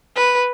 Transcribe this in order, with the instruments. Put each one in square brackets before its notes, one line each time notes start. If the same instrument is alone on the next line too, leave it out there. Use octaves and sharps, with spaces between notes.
[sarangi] B4